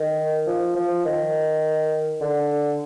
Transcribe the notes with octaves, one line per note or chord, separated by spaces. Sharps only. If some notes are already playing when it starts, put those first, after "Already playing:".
Already playing: D#3
F3
F3
D#3
D3